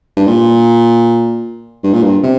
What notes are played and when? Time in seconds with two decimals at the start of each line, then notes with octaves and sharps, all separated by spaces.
0.17 G2
0.28 A#2
1.84 G2
1.94 A#2
2.03 G2
2.23 C3